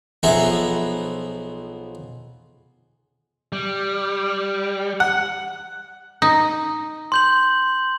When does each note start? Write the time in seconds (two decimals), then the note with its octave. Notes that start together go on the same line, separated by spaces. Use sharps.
0.23 B1 F3 B3 G#4 E5 A#5
3.53 G3
5.00 F#5
6.22 D#4
7.12 C6 G6 F#7